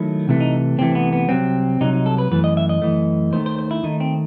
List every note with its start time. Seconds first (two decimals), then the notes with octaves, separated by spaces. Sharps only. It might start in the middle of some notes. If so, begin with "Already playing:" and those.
Already playing: D#3 F#3 A3 E4
0.27 C2 C3 E3 A3
0.40 D#4
0.78 C2 C3 E3 A3 C4
0.95 B3
1.13 B3
1.29 C2 C3 F#3 C4
1.81 C2 C3 F#3 D#4
1.93 D#4
2.06 A4
2.18 B4
2.31 F#2 E3 A3 B4
2.44 D#5
2.57 E5
2.69 D#5
2.82 F#2 E3 A3
3.33 D#2 D#3 A3 C5
3.46 C5
3.59 C5
3.71 E4
3.83 D#2 D#3 A3 D#4
4.00 C4